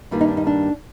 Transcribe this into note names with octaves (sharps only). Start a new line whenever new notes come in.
G2 D#3 G3 A#3 F4
D#4
D4
D#4
D4